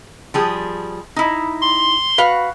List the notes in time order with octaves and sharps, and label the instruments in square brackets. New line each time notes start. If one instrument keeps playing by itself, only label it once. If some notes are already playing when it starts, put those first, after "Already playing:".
[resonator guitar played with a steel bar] F3 G3 G#4
D#4 E4
[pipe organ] C6
[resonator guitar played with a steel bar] F#4 B4 F5